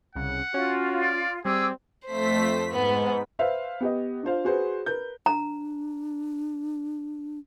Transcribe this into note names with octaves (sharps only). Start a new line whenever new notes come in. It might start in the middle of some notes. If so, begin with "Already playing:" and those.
C2 C#3 F#5
C#4 F4 F#4
D5
G3 C4 G#4 D6 E6
F2 A3 C5 B6
G#2 B3
B4 C5 E5 F5
B3 G4 D#5
D4 F4 C5 F5
F#4 G#4 B4 C5
A#4 B4 G6
D4 A#5